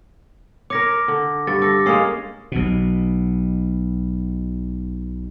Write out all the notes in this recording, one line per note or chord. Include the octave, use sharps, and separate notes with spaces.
A#4 C#5 D6 A#6
D3
G2 A6
A4 D6 A#6
G#3 A#3 C#4 D#6 C7
B1 B2